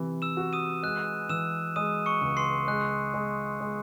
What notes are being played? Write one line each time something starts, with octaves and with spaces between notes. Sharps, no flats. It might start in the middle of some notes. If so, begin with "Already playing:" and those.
Already playing: C3 E3
E6 E7
F#4
D#6 D#7
G#3 F#6
E3 E6 E7
G#3 D#6 D#7
C#6 C#7
C#2
C6 C7
G#3 F#6
G#3
G#3